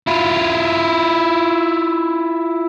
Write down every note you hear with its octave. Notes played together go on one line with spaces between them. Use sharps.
E4 F4